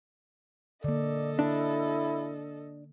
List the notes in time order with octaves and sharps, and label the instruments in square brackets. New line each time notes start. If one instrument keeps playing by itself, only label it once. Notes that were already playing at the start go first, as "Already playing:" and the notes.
[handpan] D3 A#3 [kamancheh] A4 D#5 [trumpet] D5
[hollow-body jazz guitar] D4 [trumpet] E4